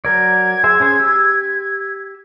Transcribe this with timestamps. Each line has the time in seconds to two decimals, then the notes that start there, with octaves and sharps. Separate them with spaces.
0.05 F#3 A#4 D5 G#6
0.64 G#4 C5 E5
0.80 C#4 G#4 C5
0.99 G4 E6